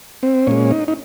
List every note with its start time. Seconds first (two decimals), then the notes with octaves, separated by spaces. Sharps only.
0.23 C4
0.47 A#2 G#3 C#4
0.71 D#4
0.88 D#4